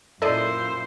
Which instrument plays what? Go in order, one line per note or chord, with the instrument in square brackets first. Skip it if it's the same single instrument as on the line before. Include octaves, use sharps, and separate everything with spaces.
[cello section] F#2 A#2 [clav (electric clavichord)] E4 [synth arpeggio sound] A4 D5 D#5 [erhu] C5